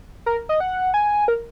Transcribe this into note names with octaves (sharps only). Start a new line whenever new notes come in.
A#4
D#5
F#5
G#5
A#4